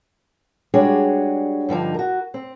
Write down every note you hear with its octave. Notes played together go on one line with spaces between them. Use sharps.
G3 G#3 D4 F#4 G#4 C#5
G2 D3 F3 D#4
F#4 A#4
C4